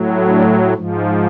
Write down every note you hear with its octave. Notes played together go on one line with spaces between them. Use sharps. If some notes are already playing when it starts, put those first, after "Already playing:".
Already playing: A2 F#3
D4
G#2 F3